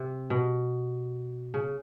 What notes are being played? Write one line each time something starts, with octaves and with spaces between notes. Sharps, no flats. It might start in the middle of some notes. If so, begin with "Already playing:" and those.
Already playing: C3
B2
C#3